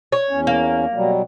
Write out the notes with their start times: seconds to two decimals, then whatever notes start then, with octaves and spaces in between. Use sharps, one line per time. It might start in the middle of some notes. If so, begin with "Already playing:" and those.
0.12 C#5
0.30 E2 C#4
0.47 A#3
0.94 B2 F#3 G3